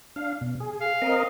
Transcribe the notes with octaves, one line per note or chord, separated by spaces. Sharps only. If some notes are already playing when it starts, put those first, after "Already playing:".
D4 F5
B2
G#4
F5
C4 A#4 D#5